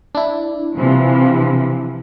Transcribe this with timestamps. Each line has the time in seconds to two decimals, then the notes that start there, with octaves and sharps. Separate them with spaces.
0.15 D4 E4
0.76 C3 E3 F3